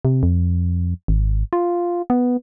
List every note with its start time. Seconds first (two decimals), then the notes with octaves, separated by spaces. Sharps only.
0.05 C3
0.23 F2
1.08 G#1
1.53 F4
2.10 B3